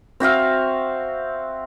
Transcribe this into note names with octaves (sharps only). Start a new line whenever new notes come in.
C4 F#4 E5 F5